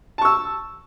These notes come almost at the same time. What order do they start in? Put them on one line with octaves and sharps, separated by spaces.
A5 C#6 E6